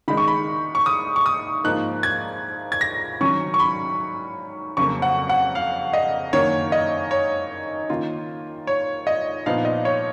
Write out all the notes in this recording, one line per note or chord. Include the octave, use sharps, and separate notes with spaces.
D#3 G#3 D#4 B5
C#6
B5
C#6
D#6
C#6
D#6
G#2 F3 A#3 D#4 F#6
G#6
G#6
A#6
D#3 F#3 C#4 C#6
C#6
B5
F2 C#3 F#3 A#3 C#6
F#5
F#5
F5
D#5
F#2 D#3 A#3 C#5
D#5
C#5
D#3 A#3 F4
C#5
D#5
A#2 F3 B3 D#4 F5
D#5
C#5